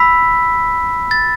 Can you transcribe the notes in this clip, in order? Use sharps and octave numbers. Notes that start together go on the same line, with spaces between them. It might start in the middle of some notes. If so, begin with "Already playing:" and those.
Already playing: B5 E6 B6
A6